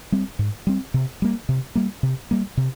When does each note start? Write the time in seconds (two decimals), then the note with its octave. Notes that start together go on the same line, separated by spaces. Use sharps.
0.12 G3 C4
0.39 G#2
0.67 G3 C4
0.94 C3
1.22 G3 A#3
1.49 C3
1.75 G3 A#3
2.03 C3
2.31 G3 A#3
2.57 C3